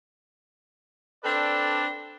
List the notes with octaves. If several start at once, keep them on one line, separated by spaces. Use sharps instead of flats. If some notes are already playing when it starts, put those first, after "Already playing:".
C4 D4 A4 B4 D5